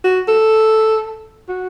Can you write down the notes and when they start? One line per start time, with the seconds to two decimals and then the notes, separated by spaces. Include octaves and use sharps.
0.04 F#4
0.28 A4
1.49 F#4